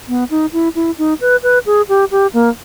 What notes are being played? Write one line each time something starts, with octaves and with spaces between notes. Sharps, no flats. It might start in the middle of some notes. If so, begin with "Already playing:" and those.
B3
D#4
E4
E4
D#4
B4
B4
G#4
G4
G4
A#3